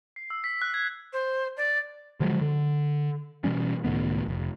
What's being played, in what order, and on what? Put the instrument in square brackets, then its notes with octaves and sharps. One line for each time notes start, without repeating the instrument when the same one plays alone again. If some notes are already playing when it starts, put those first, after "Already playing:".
[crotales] C7
E6
B6
F#6
G#6
[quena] C5
D5
[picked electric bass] D3 F3 F#3 G#3
D3
B2 E3 G3 C#4
C#2 A2 D#3 B3
F1